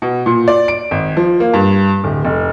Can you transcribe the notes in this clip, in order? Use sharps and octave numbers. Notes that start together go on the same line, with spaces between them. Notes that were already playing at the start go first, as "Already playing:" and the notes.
B2
A#2
D5
D7
G#1
F3
A#3
G2
D1
F1